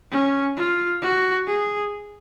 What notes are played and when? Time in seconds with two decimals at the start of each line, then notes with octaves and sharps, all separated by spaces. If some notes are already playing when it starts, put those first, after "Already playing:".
0.12 C#4
0.57 F4
1.02 F#4
1.47 G#4